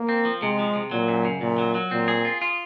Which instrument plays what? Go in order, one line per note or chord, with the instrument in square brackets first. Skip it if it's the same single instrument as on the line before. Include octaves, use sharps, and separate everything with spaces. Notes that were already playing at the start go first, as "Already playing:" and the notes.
Already playing: [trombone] A#3
[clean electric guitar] C4
F3
[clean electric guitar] C3 [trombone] G#3
[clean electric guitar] F3
C3
[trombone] A#2 [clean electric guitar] F#3
[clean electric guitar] F#2
C#3
[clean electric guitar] F#2 [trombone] A#2
[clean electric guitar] F#3
F#3
[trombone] A#2 [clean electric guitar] C4
[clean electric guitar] G#4
F4
F4